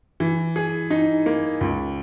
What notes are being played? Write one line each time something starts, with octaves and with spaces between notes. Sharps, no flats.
E3
G#4
D#4
A#3
C#2